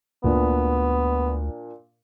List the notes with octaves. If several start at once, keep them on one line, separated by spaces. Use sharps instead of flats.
D2 A#2 B3 D4